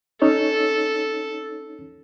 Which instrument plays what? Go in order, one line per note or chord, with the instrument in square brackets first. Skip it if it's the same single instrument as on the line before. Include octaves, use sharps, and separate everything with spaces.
[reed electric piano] C#4 D#4 C#5 [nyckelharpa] A4